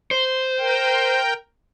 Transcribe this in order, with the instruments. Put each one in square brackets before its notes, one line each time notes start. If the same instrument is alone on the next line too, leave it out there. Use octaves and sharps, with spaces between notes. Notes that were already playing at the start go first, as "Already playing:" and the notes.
[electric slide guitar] C5
[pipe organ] A#4 G5